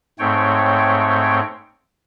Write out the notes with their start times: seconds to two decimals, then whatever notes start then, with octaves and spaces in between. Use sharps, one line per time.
0.19 G#2 A3 C4 C#5 G5